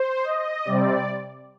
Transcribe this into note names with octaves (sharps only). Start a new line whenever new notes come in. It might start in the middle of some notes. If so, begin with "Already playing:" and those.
Already playing: C5
D#5
C3 G3 C4 D5